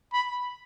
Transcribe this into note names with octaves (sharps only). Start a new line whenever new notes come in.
B5